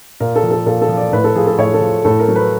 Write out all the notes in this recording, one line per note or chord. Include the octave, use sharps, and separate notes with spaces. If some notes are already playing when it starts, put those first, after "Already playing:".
A#2 A#4
A4
F3
A4
A#2 A4
A4
F3
D5
A2 B4
A4
F3 G#4
A4
A2 C#5
A4
F3
A2 A4
A#4
F#3
B4